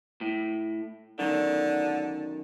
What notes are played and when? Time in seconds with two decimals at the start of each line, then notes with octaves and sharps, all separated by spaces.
0.21 A2
1.19 F#2 D3 D#3